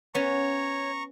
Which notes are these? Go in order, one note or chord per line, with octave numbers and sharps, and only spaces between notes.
B3 C#4 C#5 A#5 C#6